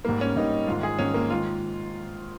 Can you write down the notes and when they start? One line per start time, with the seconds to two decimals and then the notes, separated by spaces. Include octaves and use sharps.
0.05 G#2 G3 A#3
0.21 C#4
0.36 G#2 G3 A#3 D#4
0.67 G#2 D#3 G#3 F4
0.83 G#4
0.99 G#2 D#3 G#3 C#4
1.14 A#3
1.30 D#3 G#3 F4